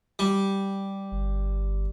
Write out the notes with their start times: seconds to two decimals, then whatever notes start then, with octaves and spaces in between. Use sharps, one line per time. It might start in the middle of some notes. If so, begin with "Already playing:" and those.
0.19 G3
1.12 G1